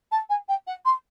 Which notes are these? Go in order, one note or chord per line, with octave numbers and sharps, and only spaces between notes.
A5
G#5
G5
F#5
C6